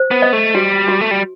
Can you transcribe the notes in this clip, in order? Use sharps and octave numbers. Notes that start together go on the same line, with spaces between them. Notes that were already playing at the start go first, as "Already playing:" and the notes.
Already playing: C5
B3
D#5
A3
G3 F#4
F#4
A3
G3